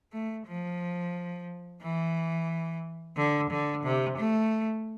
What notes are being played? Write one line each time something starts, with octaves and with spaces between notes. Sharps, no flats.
A3
F3
E3
D3
D3
C3
A3